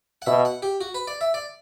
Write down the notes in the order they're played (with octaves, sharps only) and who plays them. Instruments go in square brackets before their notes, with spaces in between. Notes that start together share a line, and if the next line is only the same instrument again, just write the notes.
[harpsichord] F#5
[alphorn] B2 [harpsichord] E5
[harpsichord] F#5
G4
F#4
B4
D5
E5
D5